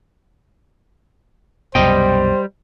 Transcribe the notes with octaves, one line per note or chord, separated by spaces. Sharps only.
C2 F#2 B2 G3 C5 D#5 G5